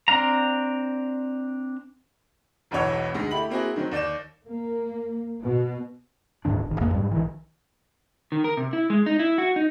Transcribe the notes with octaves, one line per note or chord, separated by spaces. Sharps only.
C4 D4 F5 A#5
E1 B1 E2 B2 C#5 E6
D2 G#3 D#4
A3 E4 G4 B5 F#7
A#3 C4 E4 F#4 G#4
D#3 F#3 C4
D#2 D5 G6 E7
A#3
B2
D1 G#2 D#3 D4
G#1 D#3
A1 F2 C#3 A#3
G#2 G3
A#1 D#3 E3
D#3
A#4
C3
E4
G#3
D#4
E4
F#4
D#4